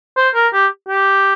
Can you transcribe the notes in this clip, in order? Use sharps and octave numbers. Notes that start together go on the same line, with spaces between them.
C5
A#4
G4
G4